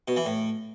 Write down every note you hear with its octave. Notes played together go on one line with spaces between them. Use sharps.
B2
E3
A2